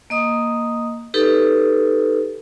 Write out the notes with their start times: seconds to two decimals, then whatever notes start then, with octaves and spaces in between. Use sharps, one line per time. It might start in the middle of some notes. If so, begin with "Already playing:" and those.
0.10 A#3 D#5 D#6
1.14 D#4 G4 A4 B4